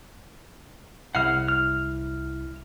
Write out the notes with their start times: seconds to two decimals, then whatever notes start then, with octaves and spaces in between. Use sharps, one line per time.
1.15 C2 E4 F#5 F6 C7
1.48 F6